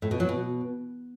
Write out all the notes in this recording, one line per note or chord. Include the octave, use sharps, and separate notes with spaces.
A2
B2
F#3
B2